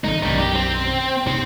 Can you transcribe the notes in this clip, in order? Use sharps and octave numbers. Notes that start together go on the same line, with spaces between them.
G#1 D3 G#3 D#4
B1 F#2 D#3 G3 D#4
G4
C4
G#2 C3 C4